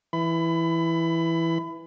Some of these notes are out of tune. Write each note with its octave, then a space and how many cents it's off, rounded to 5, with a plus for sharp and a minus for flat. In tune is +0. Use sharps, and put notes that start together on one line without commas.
E3 +0 B5 +25